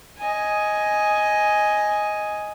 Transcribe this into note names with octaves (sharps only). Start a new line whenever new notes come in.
D#5 G#5